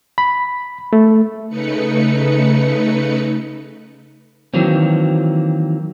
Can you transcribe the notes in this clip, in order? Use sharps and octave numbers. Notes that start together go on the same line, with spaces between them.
B5
A3
C#3 A3 D#4 B4 C#7
D#3 E3 F#3 A#3 C4